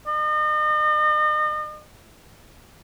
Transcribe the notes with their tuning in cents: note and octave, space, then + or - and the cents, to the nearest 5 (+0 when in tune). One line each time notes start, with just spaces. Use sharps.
D#5 -40